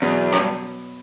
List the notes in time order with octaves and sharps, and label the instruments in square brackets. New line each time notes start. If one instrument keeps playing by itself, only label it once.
[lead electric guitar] E2 [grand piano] B2 F#3 B3
[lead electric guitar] F#2
G2